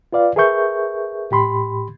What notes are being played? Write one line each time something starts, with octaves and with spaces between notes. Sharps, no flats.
F4 B4 D5 F5
G#4 A#4 B4 E5 C#6 G6
A2 G4 B5 C6